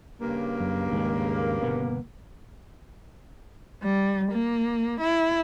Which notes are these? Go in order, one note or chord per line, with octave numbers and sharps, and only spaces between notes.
G2 C#3 A#3
F#2
D#2 G#2 G#3
G1 B2 B3
G3
A#3
E4